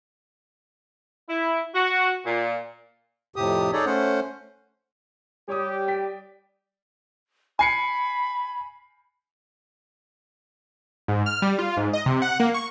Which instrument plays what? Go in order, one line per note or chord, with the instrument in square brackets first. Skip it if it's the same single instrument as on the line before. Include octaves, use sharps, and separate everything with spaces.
[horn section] E4
F#4
A#2
[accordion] F2 A2 C3 G4 D#6
D#4 G#4 A4 C#5 D5
A3 C#4 C5 F#5
[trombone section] G3 G4 [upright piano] C#5 D6 D#6
[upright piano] D5 G5 B6
[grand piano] G#5 C7 C#7 [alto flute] B5
[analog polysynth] G#2
F6
G3
F4
G#2
D#5
C3
F#5
A#3
C#6